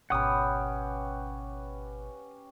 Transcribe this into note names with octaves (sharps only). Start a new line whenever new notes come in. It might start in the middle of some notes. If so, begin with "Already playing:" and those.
G#1 B2 C#4 G4 B4 F#5 D#6